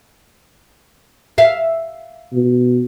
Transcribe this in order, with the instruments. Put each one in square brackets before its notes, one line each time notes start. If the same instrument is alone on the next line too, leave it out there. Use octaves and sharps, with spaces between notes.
[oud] E5 F5
[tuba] B2